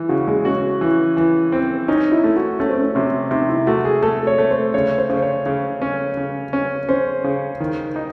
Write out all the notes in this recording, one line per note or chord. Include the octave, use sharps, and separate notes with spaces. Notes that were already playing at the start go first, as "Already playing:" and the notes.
Already playing: E3
C#3 F#4
G#3
C#4 F#4
E3
E3
C4
C#4 D#4
E4
A3
F#4
A3 C#4
C4
C#4
C3 C#4
C3 D#4
E4
A3 F#4
G#4
A3 A4
C#5
A3
C5
C#3 C#5
C5
C#3
C5
C#5
C#3
C#4
C#3
C#4
C#4 C5
C#3
D#3
D#4